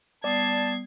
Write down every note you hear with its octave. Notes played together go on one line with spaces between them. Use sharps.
G3 B3 D5 A5 D#6 G#6 C7